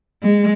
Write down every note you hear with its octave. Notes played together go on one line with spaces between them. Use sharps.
G#3